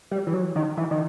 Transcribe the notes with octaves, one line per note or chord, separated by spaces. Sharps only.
G3
E3
F#3
D#3
E3
D#3